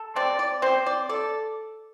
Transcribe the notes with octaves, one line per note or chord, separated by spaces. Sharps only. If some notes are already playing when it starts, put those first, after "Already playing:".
Already playing: A4
C4 D5
D5
C4 C5
D5
A4 D5